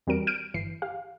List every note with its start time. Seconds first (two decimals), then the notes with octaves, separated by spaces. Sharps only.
0.07 E2 G3 C4 F#4 A#4 D7
0.27 F6 G6 D7 D#7
0.54 G1 E3 C7
0.82 G4 F5